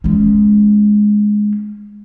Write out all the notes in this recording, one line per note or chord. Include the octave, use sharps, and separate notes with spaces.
G#3 C#4